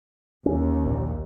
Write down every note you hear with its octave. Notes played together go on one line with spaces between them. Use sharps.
D#2 C#4
A#1 A#2